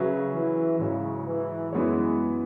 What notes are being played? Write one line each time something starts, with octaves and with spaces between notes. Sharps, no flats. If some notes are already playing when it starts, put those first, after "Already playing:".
Already playing: C#3 F#3 C#4 G#4 B4 E5
E3
G#2 C#3 F#3 E4 C#5
E3
F#2 E3 G#3 B3 E4 C#5